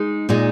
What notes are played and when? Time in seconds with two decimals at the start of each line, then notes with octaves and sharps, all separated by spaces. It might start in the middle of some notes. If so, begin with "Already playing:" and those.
Already playing: G#3 D#4
0.29 A#2 G#3 D#4